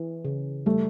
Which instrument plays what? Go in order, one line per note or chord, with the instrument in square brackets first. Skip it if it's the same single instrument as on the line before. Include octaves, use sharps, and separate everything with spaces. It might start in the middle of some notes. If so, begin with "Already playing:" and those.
Already playing: [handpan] E3
C#3
[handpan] G3 [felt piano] A3